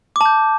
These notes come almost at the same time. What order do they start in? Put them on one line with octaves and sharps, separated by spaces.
D6 A5 G6